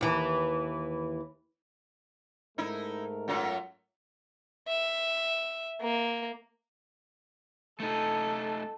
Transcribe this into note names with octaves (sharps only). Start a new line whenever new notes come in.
D#2 E3
G#2 A3 D#4 E4 A#4
F#2 F#3 F4
E5
A#3
A3 D#4 A4